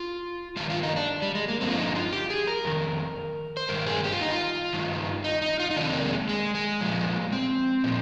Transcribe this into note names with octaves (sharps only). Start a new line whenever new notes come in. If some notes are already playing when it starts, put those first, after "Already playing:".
Already playing: F4
G2 D#3 F4
F4
D#4
D4
G3
G#3
A#3
G2 D3 F3 C4
F4
D#4
F4
G4
G#4
A#4
F2 D#3
C5
G2 D#3 A#4
G#4
G4
F4
D#4
F4
G2 D#3
D#4
D#4
F4
D#4
F2 C3 D#3 D4
A#3
G#3
G#3
G#3
A#2 F3
C4
A#2 F3